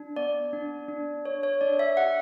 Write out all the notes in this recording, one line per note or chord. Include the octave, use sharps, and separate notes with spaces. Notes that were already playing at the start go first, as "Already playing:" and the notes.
Already playing: D4
B3 D5
D4
D4
D4 C#5
C#5
D4 D5
E5
G4 F#5